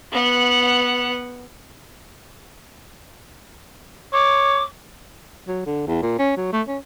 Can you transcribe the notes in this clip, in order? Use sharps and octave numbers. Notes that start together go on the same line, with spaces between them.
B3 F#5
C#5 D6
F#3
D3
E2
A#2
C#4
F#3
A3
C#4